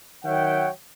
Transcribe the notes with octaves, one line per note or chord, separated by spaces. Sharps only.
D#3 F#3 C#5 E5 F#5 G5